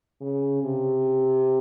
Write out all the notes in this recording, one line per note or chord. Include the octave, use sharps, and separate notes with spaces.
C#3
C3